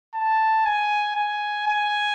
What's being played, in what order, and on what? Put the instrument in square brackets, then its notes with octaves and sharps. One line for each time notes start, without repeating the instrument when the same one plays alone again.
[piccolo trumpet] A5
G#5
G#5
G#5